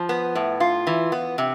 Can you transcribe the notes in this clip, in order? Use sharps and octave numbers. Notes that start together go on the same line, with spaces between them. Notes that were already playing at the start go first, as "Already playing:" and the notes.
Already playing: F3
B3
A2
F4
E3
B3
C3